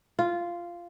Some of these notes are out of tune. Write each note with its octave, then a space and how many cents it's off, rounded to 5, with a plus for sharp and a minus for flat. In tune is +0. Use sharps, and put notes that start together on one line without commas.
F4 -10